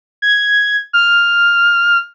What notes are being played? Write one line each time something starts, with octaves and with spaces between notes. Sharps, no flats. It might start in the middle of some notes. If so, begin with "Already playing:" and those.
G#6
F6